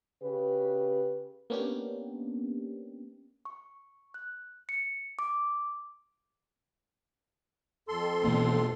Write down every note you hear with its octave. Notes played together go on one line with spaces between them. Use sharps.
C#3 G4 B4
A#3 B3 C#4 D4 G4
C#6
F#6
C#7
D6
F2 A4 C6
B2 E3 A#3